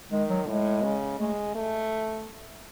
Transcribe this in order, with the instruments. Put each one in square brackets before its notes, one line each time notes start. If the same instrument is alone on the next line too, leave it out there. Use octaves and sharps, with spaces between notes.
[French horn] D#3 [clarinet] G#3
[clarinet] F#3
[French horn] A2 [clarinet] G#3
[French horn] C#3
[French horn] G#3 [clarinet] A3
[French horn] A3